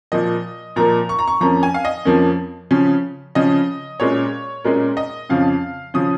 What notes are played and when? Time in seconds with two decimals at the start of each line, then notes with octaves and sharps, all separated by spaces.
0.12 A#2 F3 A#3 D#5
0.76 A#2 F3 A#3 A#5
1.09 C#6
1.19 A#5
1.27 C#6
1.40 F2 F3 A#3 C#4 A#5
1.63 G#5
1.74 F5
1.85 D#5
2.05 F2 F3 A#3 C#4
2.71 C#3 F3 C#4
3.35 C#3 F3 C#4 D#5
4.00 A#2 G#3 C#4 C#5
4.64 A#2 G#3 C#4 A#4
4.97 D#5
5.29 F2 C#3 F3 C#4 F5
5.94 C#3 F3 C#4 D#6